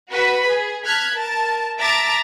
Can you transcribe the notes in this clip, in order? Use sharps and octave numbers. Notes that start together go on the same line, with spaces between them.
F#4 B4 B5
G#4
A5 F6 F#6 G#6 B6
A#4 A5
E5 A5 A#5 D6 A6 D7